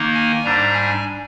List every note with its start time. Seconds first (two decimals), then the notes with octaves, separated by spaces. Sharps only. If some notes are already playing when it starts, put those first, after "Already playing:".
Already playing: D#3 A#3 D#4
0.15 G#5
0.44 G#2 G3 D4 A#5
0.74 G#5